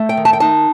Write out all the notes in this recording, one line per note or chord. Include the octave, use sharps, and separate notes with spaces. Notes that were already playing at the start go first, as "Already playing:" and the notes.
Already playing: A3
G5
D#3
A5
G5
D#4 A5